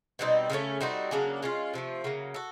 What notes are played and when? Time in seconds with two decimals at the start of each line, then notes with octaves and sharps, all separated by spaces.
0.19 B2 G3 C4 D#4
0.50 C#3 F3 A3 C#4
0.81 G3 C4 D#4 F#4
1.11 C#3 F#3 A#3 D4
1.43 G#3 C#4 F4
1.74 C3 F3 A3
2.04 C#3 F#3 A#3
2.34 F#4 A4